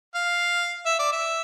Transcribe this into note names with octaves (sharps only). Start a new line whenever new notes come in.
F5
E5
D5
E5